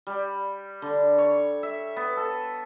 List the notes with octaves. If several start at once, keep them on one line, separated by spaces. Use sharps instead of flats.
G3
D3
C#5
E5
B3
A4